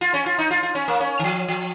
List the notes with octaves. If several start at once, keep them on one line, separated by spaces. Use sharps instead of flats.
F4
C#4
F4
D#4
F4
F4
C#4
A#3
C#4
D#3
F3
F3